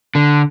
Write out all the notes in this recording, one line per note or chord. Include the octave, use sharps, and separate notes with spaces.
D3